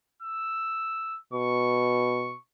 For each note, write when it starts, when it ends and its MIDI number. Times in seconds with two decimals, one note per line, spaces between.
0.22 1.19 88
1.33 2.33 47
1.33 2.40 85